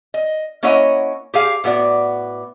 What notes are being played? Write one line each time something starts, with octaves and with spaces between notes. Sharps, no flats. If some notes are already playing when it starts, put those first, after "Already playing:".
D#5
A#3 C#4 E4 C#5 D#5 F#5
G4 G#4 F5
A2 B3 F#4 D5